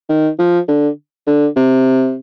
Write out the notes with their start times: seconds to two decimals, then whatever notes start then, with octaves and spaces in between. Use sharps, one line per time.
0.09 D#3
0.39 F3
0.68 D3
1.27 D3
1.56 C3